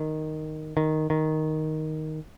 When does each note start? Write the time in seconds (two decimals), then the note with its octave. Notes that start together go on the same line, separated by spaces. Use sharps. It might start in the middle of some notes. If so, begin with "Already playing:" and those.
Already playing: D#3
0.77 D#3
1.10 D#3